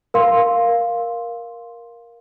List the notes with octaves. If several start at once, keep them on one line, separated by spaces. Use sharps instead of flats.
A#4 F5 C6